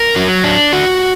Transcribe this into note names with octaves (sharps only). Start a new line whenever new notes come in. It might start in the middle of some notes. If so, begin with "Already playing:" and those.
Already playing: A#4
F#3
D4
F#4